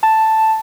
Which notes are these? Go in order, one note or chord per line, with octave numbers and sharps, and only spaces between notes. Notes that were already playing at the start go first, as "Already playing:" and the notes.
A5